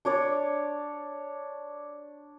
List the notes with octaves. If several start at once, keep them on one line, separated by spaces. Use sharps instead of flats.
D4 C#5 D5